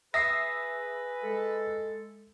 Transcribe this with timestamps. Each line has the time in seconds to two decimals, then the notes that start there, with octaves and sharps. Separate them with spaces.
0.14 G#4 B4 E5 D#6 A#6 C7
1.24 G#3 A4